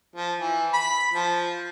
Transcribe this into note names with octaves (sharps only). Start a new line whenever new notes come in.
F3
E3
B5
F3